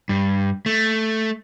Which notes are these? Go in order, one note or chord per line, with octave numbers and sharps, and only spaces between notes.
G2
A3